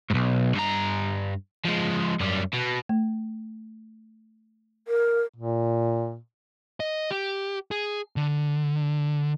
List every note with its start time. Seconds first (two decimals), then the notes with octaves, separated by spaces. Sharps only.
0.10 B1 G#2
0.55 G2 A#5
1.65 F3 G#3
2.20 F#2 G3
2.53 B2
2.89 A3
4.88 A#4
5.36 A#2
6.80 D#5
7.11 G4
7.71 G#4
8.16 D3